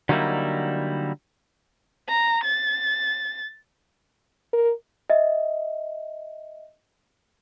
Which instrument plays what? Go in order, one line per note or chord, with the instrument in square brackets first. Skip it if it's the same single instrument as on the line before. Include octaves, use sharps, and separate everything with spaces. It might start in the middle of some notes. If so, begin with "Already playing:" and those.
[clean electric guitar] D3 F#3 G3 A#3 D#4 E4
[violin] A#5
A6
[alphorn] A#4
[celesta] D#5 E5